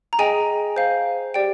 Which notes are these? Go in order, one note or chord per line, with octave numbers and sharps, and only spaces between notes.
A#5
G#4 D#5 G5 G#5
C5 F5
G4 D5 G5